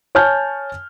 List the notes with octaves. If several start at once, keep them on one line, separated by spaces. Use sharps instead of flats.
C#5 G#5 A5 F6 G6